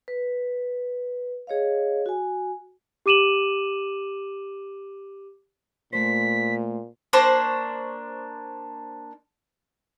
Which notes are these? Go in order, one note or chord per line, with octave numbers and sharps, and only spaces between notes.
B4
G#4 C#5 D#5 F5
F#4 G#5
G4 D6 D#7 E7 F#7
A#2 A3 C5 B6
A#3 D4 C5 C#6